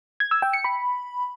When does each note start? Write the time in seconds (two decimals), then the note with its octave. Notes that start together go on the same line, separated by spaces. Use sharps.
0.20 G#6
0.31 E6
0.42 G5
0.53 C#7
0.64 B5